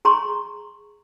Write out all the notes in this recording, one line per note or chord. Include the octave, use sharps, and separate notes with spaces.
G#4 A#5 C6 C#6